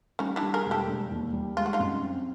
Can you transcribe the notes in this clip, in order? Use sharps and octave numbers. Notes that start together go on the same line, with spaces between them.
G3 C#4 D#4
D4 E4
G3
G#4 A#4
E1
G4 A4
E1
D#2
G3
G#3 F4
F#4
D#4 F4
F#2
C4